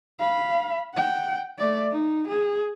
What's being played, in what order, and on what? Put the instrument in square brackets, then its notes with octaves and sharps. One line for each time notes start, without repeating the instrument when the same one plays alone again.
[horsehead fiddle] F5 B5
F#5 G5
A3 D5
D#4
G#4